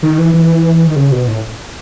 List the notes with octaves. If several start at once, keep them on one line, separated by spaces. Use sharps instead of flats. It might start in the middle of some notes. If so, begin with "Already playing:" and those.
D#3
E3
E3
D#3
C#3
B2
A2